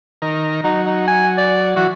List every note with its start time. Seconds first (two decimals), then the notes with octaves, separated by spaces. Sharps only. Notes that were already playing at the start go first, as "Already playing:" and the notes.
0.22 D#3 A#4
0.64 F#3 D#4
0.86 D#4
1.08 G#5
1.38 D5
1.76 E3 F#3 F#4